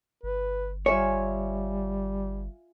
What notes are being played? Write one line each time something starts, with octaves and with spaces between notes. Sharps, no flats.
G1 B4
G3 F4 C#5 E5 G#5